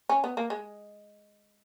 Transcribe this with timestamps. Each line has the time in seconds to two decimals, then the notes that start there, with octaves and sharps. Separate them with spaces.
0.09 C#4
0.24 B3
0.37 A#3
0.50 G#3